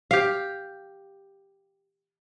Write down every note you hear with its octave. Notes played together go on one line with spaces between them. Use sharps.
G4 F5